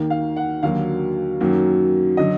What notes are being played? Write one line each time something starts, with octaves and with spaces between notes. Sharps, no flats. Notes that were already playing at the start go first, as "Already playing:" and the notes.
Already playing: D#2 D#3 A#3
F5
F#5
D#2 D3 F#3 A#3 F5
F#2 D#3 F#3 A#3
D3 F#3 D#5